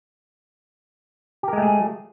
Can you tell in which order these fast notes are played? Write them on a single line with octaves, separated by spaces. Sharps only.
G4 A#4 G#3 A3 G#4